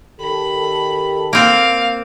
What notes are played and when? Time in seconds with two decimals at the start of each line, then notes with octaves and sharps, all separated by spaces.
0.21 D#3 G4 A4 B5
1.33 A#3 C4 F5